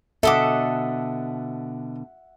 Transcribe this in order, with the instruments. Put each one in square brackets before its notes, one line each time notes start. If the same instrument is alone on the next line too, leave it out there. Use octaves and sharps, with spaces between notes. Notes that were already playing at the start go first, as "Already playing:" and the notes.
[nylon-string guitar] B2 D3 [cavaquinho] A4 D#5 D6 [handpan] E5 F#5